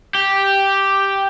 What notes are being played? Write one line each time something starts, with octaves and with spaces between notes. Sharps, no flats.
G4